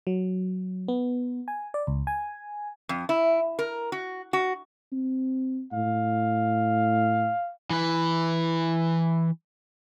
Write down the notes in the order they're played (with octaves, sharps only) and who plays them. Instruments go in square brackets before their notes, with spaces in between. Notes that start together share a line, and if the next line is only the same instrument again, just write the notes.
[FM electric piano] F#3
B3
G#5
D5
C#2
G#5
[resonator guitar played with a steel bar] F2
E4
A#4
F#4
F#4
[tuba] C4
[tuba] A2 [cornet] F5
[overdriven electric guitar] E3 B4